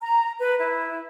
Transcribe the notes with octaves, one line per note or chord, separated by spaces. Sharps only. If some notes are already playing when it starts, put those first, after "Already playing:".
A#5
B4
E4